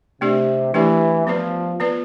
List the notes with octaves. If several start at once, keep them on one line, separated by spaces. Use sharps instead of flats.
C3 A3 D4 G4 D5
E3 A3 D4 G4 D5
F3 B3 F4 B4 D5
B3 F4 B4 D5